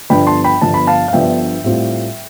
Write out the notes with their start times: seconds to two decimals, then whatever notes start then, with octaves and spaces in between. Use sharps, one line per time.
0.10 G1 G2 D3 F3 B3 G5 B5
0.27 A5 C6
0.44 G5 B5
0.61 G1 G2 D3 F3 B3 A5
0.74 B5
0.87 F5 A5
1.08 F5
1.13 G1 G2 D3 F3 B3 E5 G5
1.64 A2 G3 C4 F4